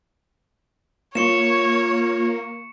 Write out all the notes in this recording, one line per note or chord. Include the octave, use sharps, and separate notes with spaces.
A#3 F4 C#5 C#6 C#7 E7